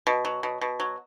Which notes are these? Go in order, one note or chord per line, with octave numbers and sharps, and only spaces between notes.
B2
F#3
B2
B2
F#3